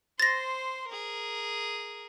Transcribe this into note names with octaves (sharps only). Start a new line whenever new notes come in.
C5 C6 A6 A#6
G#4 A#4